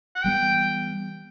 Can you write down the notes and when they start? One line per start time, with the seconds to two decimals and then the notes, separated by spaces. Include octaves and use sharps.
0.15 F#5
0.23 E3 G3 B3 G5